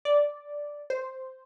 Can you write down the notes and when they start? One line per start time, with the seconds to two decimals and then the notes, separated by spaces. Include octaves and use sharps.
0.05 D5
0.90 C5